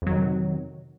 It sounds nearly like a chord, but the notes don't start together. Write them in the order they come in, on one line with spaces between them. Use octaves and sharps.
F2 F#3 D#3 C3